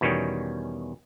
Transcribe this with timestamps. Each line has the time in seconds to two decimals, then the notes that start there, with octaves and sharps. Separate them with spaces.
0.01 E2 B2 D#3 G3 C#4